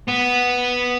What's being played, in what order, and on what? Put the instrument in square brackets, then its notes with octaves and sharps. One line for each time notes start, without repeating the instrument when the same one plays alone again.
[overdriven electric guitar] B3